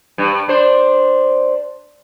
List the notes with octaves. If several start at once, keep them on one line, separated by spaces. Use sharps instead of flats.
G2
D4 C5